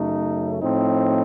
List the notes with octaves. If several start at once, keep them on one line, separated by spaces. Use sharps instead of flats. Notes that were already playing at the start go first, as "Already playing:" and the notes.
Already playing: F#2 C#3 A3 D#4
A2 F3 C4 D#4